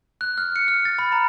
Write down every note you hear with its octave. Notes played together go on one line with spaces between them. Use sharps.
F#6
F6
C#7
F6
A6
B5
A#5